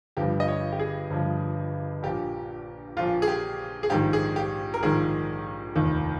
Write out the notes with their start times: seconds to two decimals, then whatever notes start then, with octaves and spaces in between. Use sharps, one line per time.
0.17 G1 G2 F3 G4
0.40 D#5
0.48 C#5
0.72 G4
0.79 G#4
1.10 G1 G2 F3
2.03 A#1 A#2 F3 G4
2.97 A#1 A#2 F3 F4
3.22 G#4
3.28 G4
3.83 G#4
3.90 A#1 G#2 D#3 G4
4.13 G#4
4.36 G4
4.74 A#4
4.83 A#1 G#2 D#3 G#4
5.76 F1 D#2 D#3